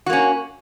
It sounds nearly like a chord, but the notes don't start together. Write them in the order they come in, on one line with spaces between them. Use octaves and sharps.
F#4 A#3 C#4